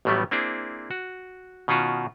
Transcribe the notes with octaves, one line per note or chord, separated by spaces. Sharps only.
A1 A2 F#3 G3 A3 B3
A#3 C4 D4 E4 G#4
F#4
B2 D#3 C#4 F4 F#4